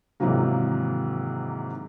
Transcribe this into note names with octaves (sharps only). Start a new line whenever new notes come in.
G#2 C3 D#3 E3 F#3 A#3